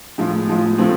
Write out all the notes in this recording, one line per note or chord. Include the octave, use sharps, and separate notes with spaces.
A2 F3 G#3
A2 F3 G#3
A2 F3 A3 C4